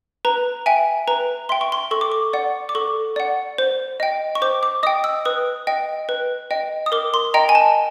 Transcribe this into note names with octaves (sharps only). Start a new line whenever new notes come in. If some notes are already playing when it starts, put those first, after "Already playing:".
B4 A#5
E5 G5 G#5
B4 A#5
E5 G5 C6
C#6
C6
A4 C#6
D6
C#6
D5 F#5
D6
A4 C#6
D5 F#5
C5
D#5 G5
C#6
C5 D6
D6
D#5 G5 D#6
E6
B4 D#6
D#5 G5
B4
D#5 G5
D#6
A#4 D6
C6
D#5 G5 A#5
G#5
A5